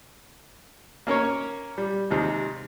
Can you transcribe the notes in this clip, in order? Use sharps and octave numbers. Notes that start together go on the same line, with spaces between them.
A#3 C#4 A#4 C#5
G3
D#2 C3 G#3